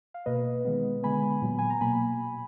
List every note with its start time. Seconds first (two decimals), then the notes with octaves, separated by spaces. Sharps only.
0.14 F5
0.26 B2 A#3 B4 D#5
0.65 D#3 G#3 B3
1.03 D3 G#3 B3 G#5 B5
1.42 A#2 F#3 B3
1.59 G#5
1.70 A#5
1.81 B2 F#3 A#3 G#5 B5